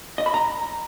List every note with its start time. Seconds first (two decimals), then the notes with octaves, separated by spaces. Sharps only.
0.18 D#5
0.26 B5
0.34 A#5